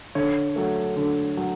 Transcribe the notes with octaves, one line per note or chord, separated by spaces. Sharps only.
D3 C#5
F#3 A3
D3
F#3